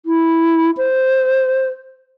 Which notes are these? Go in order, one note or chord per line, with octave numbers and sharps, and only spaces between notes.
E4
C5